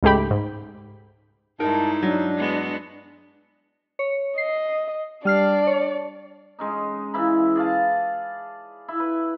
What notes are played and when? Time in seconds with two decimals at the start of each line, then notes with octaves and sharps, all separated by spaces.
0.03 C#2 G#2 A3 G4 B5
0.31 G#2
1.60 G2 G#3 D#4 E4 A#4 A5
2.02 F#3 D4
2.37 G#3 B3 F#4
3.99 C#5
4.38 D#5 C7
5.25 G3 D4 D5 F6 C7
5.67 C#5
6.59 G#3 C#4 D#4
7.14 C#3 E3 E4 B5
7.56 G#4 D5 F5 A5
8.88 E4
9.00 B4